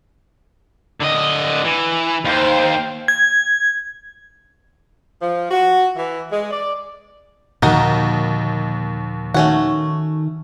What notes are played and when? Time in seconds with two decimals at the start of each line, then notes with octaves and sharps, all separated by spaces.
1.02 D3 D#5
1.65 E3
2.25 D#2 C5 F5 G5
3.08 G#6
5.22 F3
5.50 F#4
5.96 E3
6.31 G#3
6.51 D5
7.62 D#2 A#2 D3 F3 D#4 F#4 A#4
9.34 D#3 A3 C#4 F#4